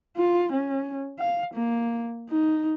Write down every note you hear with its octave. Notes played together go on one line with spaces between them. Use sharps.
F4
C#4
F5
A#3
D#4